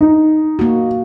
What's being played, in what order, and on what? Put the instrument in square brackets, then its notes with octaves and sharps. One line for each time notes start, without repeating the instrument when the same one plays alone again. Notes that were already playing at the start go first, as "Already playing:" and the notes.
[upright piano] D#4
[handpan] A#3 F#4